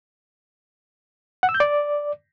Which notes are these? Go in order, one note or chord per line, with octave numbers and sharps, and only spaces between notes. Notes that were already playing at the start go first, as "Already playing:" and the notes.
F#5
E6
G6
D5